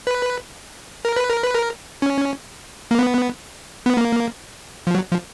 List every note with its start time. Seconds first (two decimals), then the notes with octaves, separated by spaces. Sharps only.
0.07 B4
1.05 A#4
1.16 B4
1.29 A#4
1.43 B4
1.55 A#4
2.02 C#4
2.91 A#3
2.99 B3
3.86 B3
3.97 A#3
4.87 F3
4.95 F#3
5.11 F3